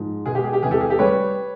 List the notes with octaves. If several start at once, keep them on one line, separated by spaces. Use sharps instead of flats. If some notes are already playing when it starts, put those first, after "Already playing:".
Already playing: G#2 F3
B2 G#3 G#4
G4
G#4
G4
E2 C3 E3 G#3 G#4
G4 A4
G#4
G4 A4
G3 B4 C#5